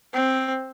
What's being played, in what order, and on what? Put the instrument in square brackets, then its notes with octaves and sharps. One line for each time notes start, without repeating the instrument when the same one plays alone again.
[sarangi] C4